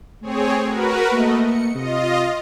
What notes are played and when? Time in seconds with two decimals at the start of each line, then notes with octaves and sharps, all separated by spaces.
0.22 A3 C4 G#4 C#5
0.66 F#4 A#4 B4
1.12 A3 A#3 D#5
1.44 C#7
1.75 C3 F4 D#5